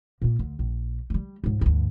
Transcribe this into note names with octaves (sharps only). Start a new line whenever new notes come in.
A#2 A#3
D2
A#1
G3 A3
C#2 G#2
D2 G2